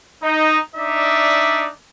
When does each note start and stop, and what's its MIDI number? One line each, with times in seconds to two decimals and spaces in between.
0.23 0.58 63
0.76 1.68 62
0.76 1.68 63
0.76 1.68 74
0.76 1.68 76